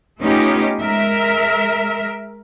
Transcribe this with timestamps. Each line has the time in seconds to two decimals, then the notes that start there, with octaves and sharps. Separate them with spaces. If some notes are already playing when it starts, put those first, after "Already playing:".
0.20 A3 B3 C#4 D#4 F4 G4
0.81 G#3 A#4 E5